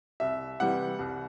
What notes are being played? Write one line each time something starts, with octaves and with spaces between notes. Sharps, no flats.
C2 E5
C3 E3 G3 F#5
C2